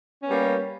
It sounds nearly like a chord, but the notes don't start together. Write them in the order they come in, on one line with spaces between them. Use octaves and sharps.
C#4 B3 G3 A#3